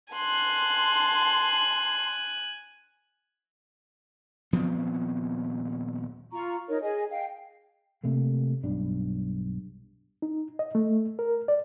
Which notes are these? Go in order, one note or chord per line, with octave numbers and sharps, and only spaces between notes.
G#5 A5 C6 F#6
D#1 F3 B3 C4
F4 A#5 C#6
D#4 A#4 C#5
G#4 D#5 G#5
F5 G5
C3 A3 A#3
B1 G2 D4
D#4
D#5
A3
A#4
D5